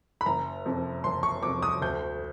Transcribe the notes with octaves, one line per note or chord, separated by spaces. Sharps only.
B5
F#1 A#5
F2 C3
F#1 C6
C#6
F2 C3 D6
D#6
D2 G6